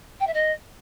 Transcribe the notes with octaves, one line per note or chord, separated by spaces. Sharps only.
G5
E5
D#5